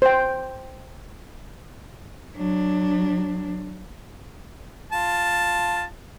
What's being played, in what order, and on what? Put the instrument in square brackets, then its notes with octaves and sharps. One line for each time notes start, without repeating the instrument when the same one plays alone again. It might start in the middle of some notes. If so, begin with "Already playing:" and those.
[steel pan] C5 G5
[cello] F#3 D4
[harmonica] F4 A5